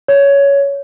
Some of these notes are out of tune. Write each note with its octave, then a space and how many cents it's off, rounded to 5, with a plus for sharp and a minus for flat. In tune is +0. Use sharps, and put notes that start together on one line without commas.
C#5 +15